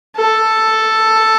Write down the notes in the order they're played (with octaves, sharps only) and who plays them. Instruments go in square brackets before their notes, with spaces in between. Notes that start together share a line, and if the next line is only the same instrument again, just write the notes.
[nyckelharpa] A4